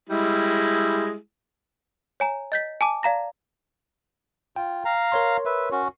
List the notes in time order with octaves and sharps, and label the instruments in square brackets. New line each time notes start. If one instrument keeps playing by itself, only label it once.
[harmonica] G3 G#3 E4
[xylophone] C#5 G#5 A#5
D#5 G6 B6
G#5 A5 D6
D5 F5 A#5 A#6
[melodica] F4 [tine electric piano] G5
[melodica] F5 A#5
[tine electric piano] A#4 C#5 C6
[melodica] B4 E5
C#4 F#4